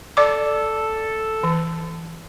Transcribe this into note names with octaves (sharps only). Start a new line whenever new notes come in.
A4 D5 D6
E3